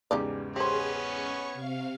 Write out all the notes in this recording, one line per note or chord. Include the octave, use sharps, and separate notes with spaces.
E2 G#2 C#3 G3 D#4 D5
B3 C#4 G4 G#4 C5 C#5
C#6
C3 F5